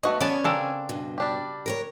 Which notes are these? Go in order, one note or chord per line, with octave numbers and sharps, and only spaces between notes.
A3 B3 F#4 D#5
B3 C#4 C#5 D5 G#5 A5
C#3 C4 D4 A4 A#4
G2 B2
G3 D4 G4
A#4 B4 C#5